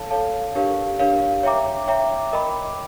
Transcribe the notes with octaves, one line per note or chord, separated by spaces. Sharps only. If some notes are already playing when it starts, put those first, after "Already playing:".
Already playing: A4 C#5 F5 A5
A4 C#5 F5 A5
D4 G4 A#4 C#5 F5
D4 G4 A#4 C#5 F5
C#5 E5 G5 A#5 D6
C#5 E5 G5 A#5 D6
A#4 D#5 G5 B5 D6